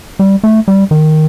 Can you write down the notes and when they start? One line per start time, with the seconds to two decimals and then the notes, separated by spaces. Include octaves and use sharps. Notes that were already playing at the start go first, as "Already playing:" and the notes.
0.19 G3
0.44 A3
0.68 G3
0.91 D#3